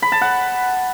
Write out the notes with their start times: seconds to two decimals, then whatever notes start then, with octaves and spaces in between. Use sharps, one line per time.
0.02 B5
0.12 A5
0.21 F#5